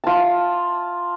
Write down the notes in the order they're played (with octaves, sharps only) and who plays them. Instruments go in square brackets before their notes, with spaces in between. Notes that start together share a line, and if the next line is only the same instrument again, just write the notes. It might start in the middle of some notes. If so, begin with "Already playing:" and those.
[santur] F4 A5